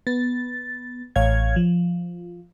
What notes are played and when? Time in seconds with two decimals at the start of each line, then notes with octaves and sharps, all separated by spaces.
0.07 B3 A6
1.16 A1 C#5 F5 G#6
1.56 F3